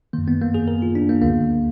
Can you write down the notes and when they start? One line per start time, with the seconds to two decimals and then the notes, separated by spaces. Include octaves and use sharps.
0.13 F#2 D#3 A#3
0.28 B3
0.41 A#3
0.54 G#4
0.68 A#4
0.82 F4
0.95 D4
1.09 A#3
1.22 D2 D3 A#3